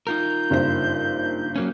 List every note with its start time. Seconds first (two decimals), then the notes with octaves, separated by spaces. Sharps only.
0.07 D#4 F4 A#4 G6
0.50 F#1 G2 C5
1.56 F#3 A#3 C#4